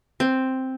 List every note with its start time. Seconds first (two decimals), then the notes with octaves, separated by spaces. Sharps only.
0.20 C4